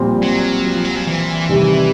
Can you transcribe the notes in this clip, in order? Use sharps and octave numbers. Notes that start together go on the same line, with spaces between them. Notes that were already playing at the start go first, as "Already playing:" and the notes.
Already playing: A#1 A#2 G3 C4
F#3
F3
F#3
F3
E3
C3 D#3 G3